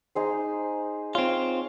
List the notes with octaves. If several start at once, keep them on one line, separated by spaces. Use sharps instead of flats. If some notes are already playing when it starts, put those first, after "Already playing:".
D#4 G#4 C5
C4 F4 C#5